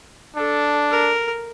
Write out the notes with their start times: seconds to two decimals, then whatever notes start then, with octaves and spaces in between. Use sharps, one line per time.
0.36 D4 A4
0.91 A#4